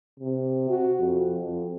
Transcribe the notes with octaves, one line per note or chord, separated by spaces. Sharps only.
C3
F#4
F2
F2